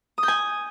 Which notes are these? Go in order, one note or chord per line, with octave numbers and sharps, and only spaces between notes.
D#6
G6
G#5